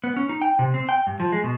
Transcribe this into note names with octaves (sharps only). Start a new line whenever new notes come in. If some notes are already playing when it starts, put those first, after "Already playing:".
B3
C#4
D#4
G5
C3
C4
G5
G2
F3
G#3
B2